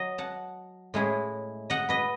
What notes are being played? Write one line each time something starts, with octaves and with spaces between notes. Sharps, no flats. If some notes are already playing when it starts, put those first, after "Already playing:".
Already playing: F#3 D#5
F#5 A5
A2 G#3 C#4 E4
D#5 F#5
B4 D#5